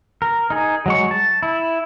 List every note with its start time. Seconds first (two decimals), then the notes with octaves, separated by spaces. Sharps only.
0.22 A#4
0.50 D#4 G#4
0.86 F#3 G#3 C#6
1.11 A5
1.43 E4